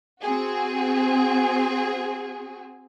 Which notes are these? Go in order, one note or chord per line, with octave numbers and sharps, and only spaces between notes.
C4 F#4 G#4